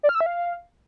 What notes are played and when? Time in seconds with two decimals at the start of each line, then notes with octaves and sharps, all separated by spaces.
0.03 D5
0.09 F6
0.15 E6
0.21 E5
0.26 F5